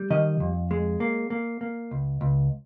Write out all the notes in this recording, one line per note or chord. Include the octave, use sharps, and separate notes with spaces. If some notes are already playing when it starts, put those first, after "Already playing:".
Already playing: G3
D#3 D#5
F2
G#3
A#3
A#3
A#3
C#2
C#2